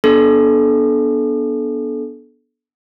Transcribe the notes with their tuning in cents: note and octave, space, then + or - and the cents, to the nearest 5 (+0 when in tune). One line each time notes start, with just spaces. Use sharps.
B3 -20 D4 -5 A4 -25